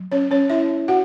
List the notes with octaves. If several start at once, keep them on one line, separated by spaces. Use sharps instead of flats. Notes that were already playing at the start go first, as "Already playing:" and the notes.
Already playing: F#3
C#4 C#5
C#4 C#5
E4 E5
F#4 F#5